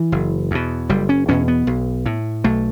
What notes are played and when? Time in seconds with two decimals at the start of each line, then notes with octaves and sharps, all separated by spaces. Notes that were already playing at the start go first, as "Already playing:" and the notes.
Already playing: E3
0.12 F#1
0.51 E2 B2
0.90 F#1 G3
1.09 C#4
1.29 E2 B2 C#4
1.48 B3
1.67 B1
2.06 A2
2.44 B1 A3